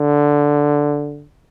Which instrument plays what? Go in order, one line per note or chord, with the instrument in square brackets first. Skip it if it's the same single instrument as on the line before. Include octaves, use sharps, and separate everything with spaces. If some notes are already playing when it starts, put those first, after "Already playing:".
Already playing: [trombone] D3